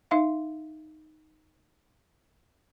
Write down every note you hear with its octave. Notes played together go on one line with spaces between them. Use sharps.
D#4 E5 F5